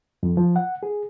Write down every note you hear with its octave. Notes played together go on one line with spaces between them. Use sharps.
F2
F3
F#5
G#4